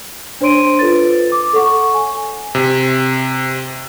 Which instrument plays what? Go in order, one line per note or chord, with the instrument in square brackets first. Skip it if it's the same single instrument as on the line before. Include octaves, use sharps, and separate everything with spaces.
[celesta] D4 C5 C#5 C6 D7 D#7
F4 A4 B4 A6
D6
A4 C#5 F#5 C#6
G#5
[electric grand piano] C3